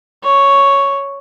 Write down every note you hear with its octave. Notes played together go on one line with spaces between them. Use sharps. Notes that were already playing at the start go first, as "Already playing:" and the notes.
C#5